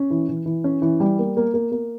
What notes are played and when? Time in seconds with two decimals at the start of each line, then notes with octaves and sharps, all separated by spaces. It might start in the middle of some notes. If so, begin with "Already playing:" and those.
Already playing: C#4
0.10 E3
0.28 E3
0.46 E3
0.64 C#4
0.82 E3
1.00 G3
1.19 A#3
1.37 A#3
1.54 A#3
1.72 A#3